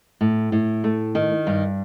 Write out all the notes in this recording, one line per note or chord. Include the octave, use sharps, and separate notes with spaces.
A2
A2
A3
D#3
G2